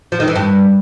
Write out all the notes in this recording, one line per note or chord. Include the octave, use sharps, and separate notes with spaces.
F3
D#3
E3
G2